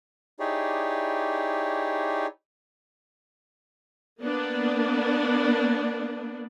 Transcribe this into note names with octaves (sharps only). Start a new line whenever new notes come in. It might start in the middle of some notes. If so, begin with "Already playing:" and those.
D#4 E4 G4 G#4 C#5 D5
A#3 B3 D4